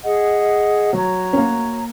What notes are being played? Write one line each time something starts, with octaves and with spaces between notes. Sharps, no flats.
G#4 D#5 F#5
F#3 F#4 C#5 A#5
C#4
A#3